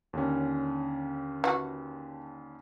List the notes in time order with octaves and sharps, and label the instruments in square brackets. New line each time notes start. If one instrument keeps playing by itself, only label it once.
[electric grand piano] D#2 D3 C#4
[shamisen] E3 F#4